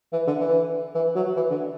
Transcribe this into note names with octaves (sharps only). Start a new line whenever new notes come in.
E3
D3
E3
E3
F#3
E3
D3